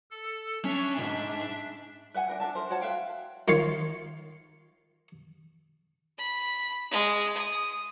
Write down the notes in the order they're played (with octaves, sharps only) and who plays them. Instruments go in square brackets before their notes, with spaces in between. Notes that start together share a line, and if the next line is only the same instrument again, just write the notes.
[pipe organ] A4
[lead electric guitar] C#4 [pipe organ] D4 E5
[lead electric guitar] B1 G#2
[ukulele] B4 E5 F#5 G#5
D4 A#4 B4
D4 A4 E5 A5
A#4 C5
F#4 C#5 F#5 A5
B4 E5 F5 G5
[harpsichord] D#3 F4 C#5 F5
[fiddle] B5
G#3
D#6